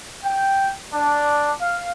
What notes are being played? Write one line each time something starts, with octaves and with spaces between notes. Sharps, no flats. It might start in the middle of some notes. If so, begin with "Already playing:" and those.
G5
D4
F5